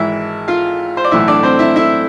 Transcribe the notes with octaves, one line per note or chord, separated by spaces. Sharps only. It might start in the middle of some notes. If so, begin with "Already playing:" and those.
Already playing: G#1 G#2 E3 E4 E5
F4 F5
C5
D5
B1 A2 E3 E4 E5
D4 D5
C4 C5
E4 E5
E4 E5